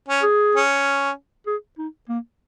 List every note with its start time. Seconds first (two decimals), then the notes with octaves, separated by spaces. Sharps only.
0.08 C#4
0.23 G#4
0.55 C#4
1.47 G#4
1.78 D#4
2.09 A#3